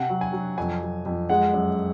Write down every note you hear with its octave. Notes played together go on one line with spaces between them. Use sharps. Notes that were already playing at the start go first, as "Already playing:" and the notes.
Already playing: C3 F#5
F#3
G#5
F#3
F2 G#5
F#3
F2
G#3 F#5
F#2